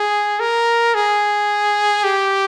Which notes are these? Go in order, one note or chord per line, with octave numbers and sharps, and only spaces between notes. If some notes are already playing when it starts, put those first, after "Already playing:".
Already playing: G#4
A#4
G#4
G4